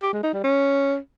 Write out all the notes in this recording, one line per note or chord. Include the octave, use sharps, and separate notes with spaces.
G4
G#3
D#4
G3
C#4